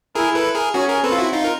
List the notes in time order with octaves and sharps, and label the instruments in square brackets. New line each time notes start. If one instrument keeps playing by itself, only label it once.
[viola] E4 [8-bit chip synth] G#4 A#4
[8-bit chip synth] A4 B4
G#4 A#4
[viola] C#4 [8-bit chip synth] F#4 G#4
[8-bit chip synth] G#4 A#4
[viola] C4 [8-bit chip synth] A4 B4
[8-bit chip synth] F4
E4 F#4
D#4 F4
A#4